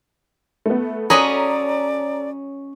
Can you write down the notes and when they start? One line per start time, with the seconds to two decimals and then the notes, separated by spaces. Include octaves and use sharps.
0.66 A3 B3
1.10 F#3 C#4 G#4 A4 D5 D#5 A#5 B5